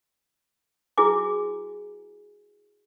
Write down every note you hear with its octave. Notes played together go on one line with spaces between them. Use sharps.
E4 F#4 G#4 B4 G#5 D6